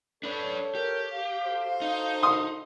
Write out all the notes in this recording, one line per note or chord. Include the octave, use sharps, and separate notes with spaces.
D4 A4 B4 C#5
G4 A#4
F5
F#4 A4 C5
D#4
C6 D#6